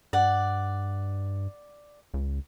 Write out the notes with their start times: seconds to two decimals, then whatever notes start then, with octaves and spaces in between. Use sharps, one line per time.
0.13 G2 D5 F#5
2.14 C#2